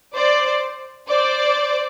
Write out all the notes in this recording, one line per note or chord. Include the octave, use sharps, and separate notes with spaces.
C5 D5
C5 D5